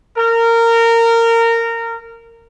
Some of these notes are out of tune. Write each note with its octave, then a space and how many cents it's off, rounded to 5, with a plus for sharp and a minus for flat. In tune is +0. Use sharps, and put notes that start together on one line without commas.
A#4 -20